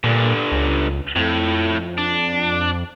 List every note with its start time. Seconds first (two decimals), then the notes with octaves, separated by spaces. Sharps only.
0.04 G2 A#2 D3
0.52 C#2
1.16 F2 A2
1.98 D4